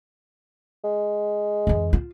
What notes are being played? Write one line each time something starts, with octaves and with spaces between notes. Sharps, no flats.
G#3
F2 E3
F4